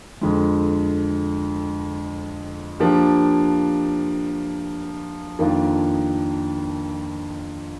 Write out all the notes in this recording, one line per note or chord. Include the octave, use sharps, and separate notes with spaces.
F2 D3 G#3
F3 A#3 D4 G4
F2 D#3 A#3 D4 F4